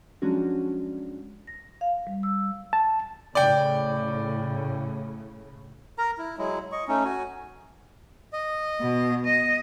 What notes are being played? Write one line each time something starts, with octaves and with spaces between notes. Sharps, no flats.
F3 F#3 G#3 C#4 D4 F#4
A#6
F5
G3
E6
A5
A2 C#3 D5 G5
A#4 A#5
E4
F#3 G#3 E4
D#5 C#6
A3 C#4 D#4
F#4 G#5
D#5
B2
D#5